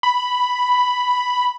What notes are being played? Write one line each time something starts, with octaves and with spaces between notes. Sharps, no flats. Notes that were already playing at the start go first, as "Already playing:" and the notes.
B5